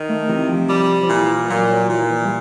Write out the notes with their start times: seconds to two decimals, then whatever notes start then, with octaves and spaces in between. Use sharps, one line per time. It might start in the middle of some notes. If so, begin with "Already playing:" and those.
Already playing: D#3
0.09 A3
0.28 C3 E3
0.49 F3
0.69 F3 G3
1.03 F3
1.09 A#2 E3
1.49 A#2 F#3
1.70 F#3
1.89 A#2 E3
2.10 E3
2.25 G3